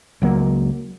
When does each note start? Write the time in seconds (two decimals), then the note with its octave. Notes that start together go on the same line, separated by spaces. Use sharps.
0.22 C#2 F#3 A#3